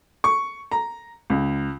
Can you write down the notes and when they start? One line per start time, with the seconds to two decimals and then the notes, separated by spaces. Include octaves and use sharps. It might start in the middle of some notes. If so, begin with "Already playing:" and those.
0.24 C#6
0.71 A#5
1.30 C#2